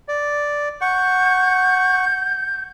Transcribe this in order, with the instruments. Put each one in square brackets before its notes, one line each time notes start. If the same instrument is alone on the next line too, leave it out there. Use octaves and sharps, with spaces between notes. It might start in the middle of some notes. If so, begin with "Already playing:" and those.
[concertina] D5
[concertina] F#5 C#6 [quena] G6